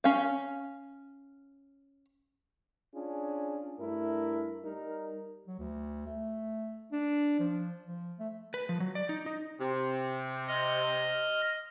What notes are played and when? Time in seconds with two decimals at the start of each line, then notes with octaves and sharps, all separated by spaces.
0.04 C#4 F5
2.93 C#4 D4 F4 G#4
3.79 G2 A3 E4 A#4
4.65 G3 D#4 A#4
5.47 F#3
5.59 D2
6.06 A3
6.92 D4
7.39 F3
7.87 F3
8.19 A3
8.54 B4
8.69 F3
8.80 F#3
8.95 D5
9.09 D#4
9.26 D#4
9.59 C3
10.48 D#5 F6